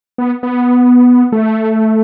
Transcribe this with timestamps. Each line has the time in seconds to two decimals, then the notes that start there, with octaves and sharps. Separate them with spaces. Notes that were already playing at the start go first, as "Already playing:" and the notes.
0.18 B3
0.43 B3
1.32 A3